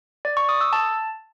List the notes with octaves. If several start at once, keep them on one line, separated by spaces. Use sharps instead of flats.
D5
C#6
D#6
E6
A5